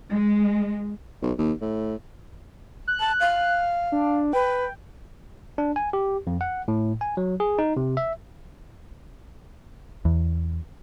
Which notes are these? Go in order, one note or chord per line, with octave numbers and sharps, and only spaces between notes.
G#3
B1
D#2
A2
F#6
A5
F5
D4
B4 G5
D4
G#5
G4
F2
F#5
A2
G#5
F#3
G#4
D#4
C3
E5
E2